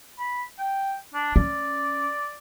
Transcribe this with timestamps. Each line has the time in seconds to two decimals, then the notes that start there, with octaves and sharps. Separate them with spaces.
0.19 B5
0.58 G5
1.14 D4
1.36 C#4 D5